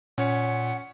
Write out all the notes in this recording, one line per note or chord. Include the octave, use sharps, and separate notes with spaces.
A#2 C#4 C#5 F#5